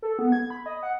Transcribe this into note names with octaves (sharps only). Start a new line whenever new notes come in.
A4
B3
G#6
B5
D#5
F#5